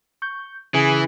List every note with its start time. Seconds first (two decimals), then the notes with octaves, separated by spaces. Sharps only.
0.22 C#6 G6
0.74 C#3 E3 G#4